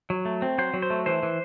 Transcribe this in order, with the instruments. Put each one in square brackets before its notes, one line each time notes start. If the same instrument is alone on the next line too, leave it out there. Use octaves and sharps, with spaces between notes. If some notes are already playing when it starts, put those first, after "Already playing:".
[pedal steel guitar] F#3
A3
C4
F#3 C5
F#3
C5
A3
E3 C5
E3